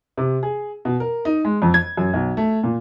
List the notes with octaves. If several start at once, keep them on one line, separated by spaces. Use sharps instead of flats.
C3
G#4
B2
A#4
D#4
G#3
F2
G#6
F#2
B1
A3
A#2